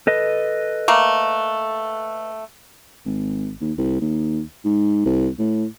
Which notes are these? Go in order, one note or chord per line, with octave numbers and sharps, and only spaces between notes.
A4 B4 D#5
A3 A#3
G#1
D#2
C2
D#2
G#2
C2
A2